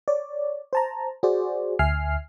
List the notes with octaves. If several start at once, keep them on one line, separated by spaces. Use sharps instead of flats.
C#5 D5
C5 A5 A#5
F#4 G#4 C5 D5
D2 E5 G#5 F6 C7